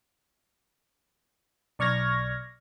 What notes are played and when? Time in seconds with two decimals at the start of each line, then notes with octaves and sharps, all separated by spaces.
1.79 B1 D5 C#6 F6 G#6 A#6